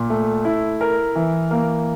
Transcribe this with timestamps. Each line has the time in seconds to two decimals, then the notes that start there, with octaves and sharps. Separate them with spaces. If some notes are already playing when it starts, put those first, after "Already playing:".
Already playing: A#2
0.10 A3
0.45 E4
0.81 A#4
1.16 E3
1.51 A#3